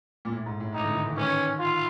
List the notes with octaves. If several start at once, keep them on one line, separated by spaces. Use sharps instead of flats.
A#2
A2
G#2
A2
A2 D#4
D3
D#3
E3
D#3 C#4
F4